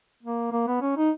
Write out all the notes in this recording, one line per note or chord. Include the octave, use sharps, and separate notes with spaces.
A#3
A#3
B3
C#4
D#4